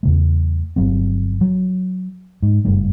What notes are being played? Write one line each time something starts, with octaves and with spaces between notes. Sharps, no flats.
E2 C#3 A3
G1 F#3 C4
F#3
G#2
F#1 G2 A3